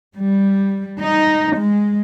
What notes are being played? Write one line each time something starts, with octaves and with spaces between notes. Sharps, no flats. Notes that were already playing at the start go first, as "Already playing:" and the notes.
G3
D#4
G#3